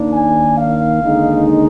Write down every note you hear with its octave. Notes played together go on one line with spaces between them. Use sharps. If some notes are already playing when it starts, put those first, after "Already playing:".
Already playing: D#2 D#3 A#3 D4
G#5
F5
D#2 D3 G#3 D#4